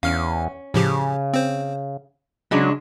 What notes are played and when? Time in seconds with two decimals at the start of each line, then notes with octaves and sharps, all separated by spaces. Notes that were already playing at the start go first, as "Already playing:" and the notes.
0.03 E2 C#4 F5 F6
0.74 A2 C#3 F3 G4
1.34 C4 C5
2.51 C#3 F#3 G#3 D4